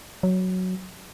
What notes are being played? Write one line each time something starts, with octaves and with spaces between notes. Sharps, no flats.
F#3